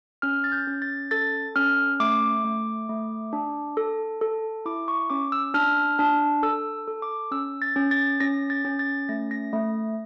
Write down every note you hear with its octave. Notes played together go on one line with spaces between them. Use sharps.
C#4 F6
A6
G6
C#4
A6
A4 A6
C#4 F6
A3 D6
A3
A3
D4
A4
A4
E4 D6
C#6
C#4 D6
E6
D4 F6
D4
A4 E6
A4
D6
C#4 E6
A6
C#4
A6
C#4 A#6
A6
C#4
A6
A3 A#6
A#6
A3